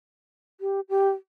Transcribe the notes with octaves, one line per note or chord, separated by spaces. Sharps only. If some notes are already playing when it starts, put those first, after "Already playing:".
G4
G4